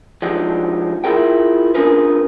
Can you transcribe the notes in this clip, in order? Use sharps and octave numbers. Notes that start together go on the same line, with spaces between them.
F3 F#3 G#3 D4 D#4 G4
E4 F4 G#4 A#4 G5
C#4 D4 F4 G#4 A#4 B4